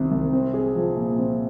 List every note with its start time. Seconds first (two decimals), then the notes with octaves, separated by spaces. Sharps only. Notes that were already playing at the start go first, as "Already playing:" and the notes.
Already playing: C2 C3 D#3 C4
0.11 C2
0.33 C4
0.54 G#4
0.75 F3
0.96 A#2
1.18 C4